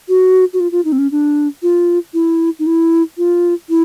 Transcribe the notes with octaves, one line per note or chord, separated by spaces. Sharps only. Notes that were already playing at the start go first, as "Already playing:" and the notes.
F#4
F#4
F4
F4
D#4
C4
C#4
D4
F4
E4
D#4
E4
F4
E4